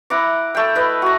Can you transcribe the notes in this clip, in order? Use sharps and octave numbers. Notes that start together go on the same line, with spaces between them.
E4 F#5 A#5 D6
A3 G5
E4 B4 D#5
F#4 A#5